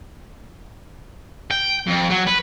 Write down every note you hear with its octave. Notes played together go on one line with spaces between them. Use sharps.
G5
F2
F#3
B4